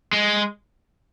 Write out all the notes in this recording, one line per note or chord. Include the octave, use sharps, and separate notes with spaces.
G#3